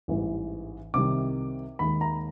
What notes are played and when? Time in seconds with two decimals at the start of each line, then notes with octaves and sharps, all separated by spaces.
0.08 A1 G#2 E3 G3
0.94 C2 C3 D#3 G3 D6
1.79 D#2 D#3 G#3 B5
2.01 A#5